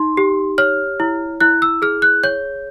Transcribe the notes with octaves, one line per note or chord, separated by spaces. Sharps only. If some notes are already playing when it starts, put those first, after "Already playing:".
Already playing: D#4 C6
G4
C#5 F6
E4
E4 F#6
E6
G#4 F6
F#6
C#5 G6